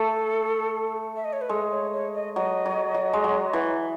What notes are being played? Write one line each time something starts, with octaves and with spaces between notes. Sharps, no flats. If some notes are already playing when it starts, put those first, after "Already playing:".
Already playing: A3 A4
E5
D#5
C#5
B4
G#3 A4
C#5
C#5
D#5
F#3 D#5
F#3
F#3
G#3
F#3
E3